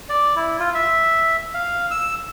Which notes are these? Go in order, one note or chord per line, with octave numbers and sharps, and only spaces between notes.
D5
E4
F4
E5
F5
E6